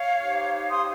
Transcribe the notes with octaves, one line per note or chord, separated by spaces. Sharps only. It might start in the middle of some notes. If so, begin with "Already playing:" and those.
Already playing: C#5 F5
D#4 G4 C5
C6 D#6